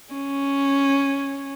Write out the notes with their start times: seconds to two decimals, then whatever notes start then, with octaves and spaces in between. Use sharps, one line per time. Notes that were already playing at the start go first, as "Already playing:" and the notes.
0.13 C#4